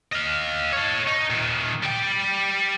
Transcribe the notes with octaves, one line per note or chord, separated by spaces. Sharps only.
D#5 F5
A4 C#5
D#4
A#2 D#3
G3 G5